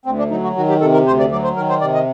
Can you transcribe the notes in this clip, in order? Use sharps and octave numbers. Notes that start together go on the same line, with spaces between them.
D2 C4
D4
F#3 D#4
F#4
D#3 F#4
G4
C3 A4
A#4
D2 C5
D5
F#3 D5
C5
D#3 A#4
C5
C3 D5
D#5